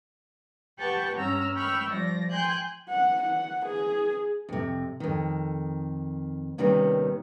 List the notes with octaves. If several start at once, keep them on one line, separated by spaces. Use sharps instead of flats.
G4 B4 F#5 G5 A5 C#6
G2 C#4 A#5 E6 F6
G5 B5 C#6 E6 F6
F3 G3 D5 A#6
G5 G#5 C6 F#6 G6
F#5
F#5
G#4
F2 C3
F2 D#3
D#2 C3 D#3 G3 B3 C#4